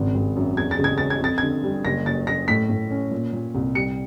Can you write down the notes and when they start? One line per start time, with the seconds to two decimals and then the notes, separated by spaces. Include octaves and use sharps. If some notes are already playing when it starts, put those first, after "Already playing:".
Already playing: G#1 C#3
0.15 G#1
0.36 F#2
0.57 E2 G#6
0.71 A6
0.79 C#3
0.84 G#6
0.98 C#3 A6
1.10 G#6
1.21 F2 A6
1.38 D3 G#6
1.64 G3
1.85 F#1 A#6
2.06 F#1 A6
2.27 F#1 A#6
2.48 A2 B6
2.69 A2
2.91 C#4
3.11 A#2
3.33 A#2
3.55 C2
3.75 G3 C#7